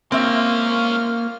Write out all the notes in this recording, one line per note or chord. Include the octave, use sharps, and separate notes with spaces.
G#3 A#3 C4 C#4 F4 E5 F6